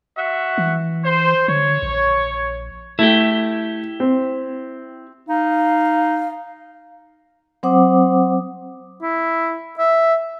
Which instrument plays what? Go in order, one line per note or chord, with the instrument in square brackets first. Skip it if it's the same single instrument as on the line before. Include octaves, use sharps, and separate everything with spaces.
[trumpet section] F#4 E5 F#5
[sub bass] E3
[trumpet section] C5
[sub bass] D3 [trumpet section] C#5
[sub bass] A#1
[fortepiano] A3 [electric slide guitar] E4 G4
[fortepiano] C4
[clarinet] D#4 [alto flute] F5
[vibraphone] F#3 C4 C5 F#5 D6 D#6
[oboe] E4
E5